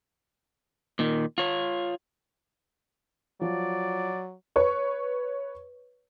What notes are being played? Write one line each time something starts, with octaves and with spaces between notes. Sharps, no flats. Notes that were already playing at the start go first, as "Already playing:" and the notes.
A#2 D#3
F4 C#5
F3 F#3 D5
B4 C#5 C#6